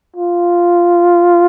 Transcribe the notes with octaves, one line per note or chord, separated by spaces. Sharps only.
F4